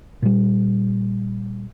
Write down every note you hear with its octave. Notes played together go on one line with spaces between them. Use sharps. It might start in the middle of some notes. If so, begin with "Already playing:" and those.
A#2 G3